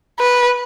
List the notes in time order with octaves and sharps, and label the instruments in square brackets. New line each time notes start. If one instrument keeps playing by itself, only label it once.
[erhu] B4